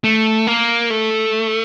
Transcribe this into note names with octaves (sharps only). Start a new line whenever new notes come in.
A3
A#3
A3